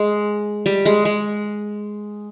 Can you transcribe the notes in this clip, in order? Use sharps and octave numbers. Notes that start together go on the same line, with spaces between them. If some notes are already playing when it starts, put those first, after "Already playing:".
Already playing: G#3
G3
G#3
G#3